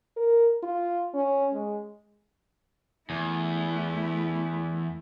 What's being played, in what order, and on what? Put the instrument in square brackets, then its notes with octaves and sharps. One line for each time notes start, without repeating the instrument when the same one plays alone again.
[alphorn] A#4
F4
C#4
G#3
[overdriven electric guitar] E2 [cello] A3 E4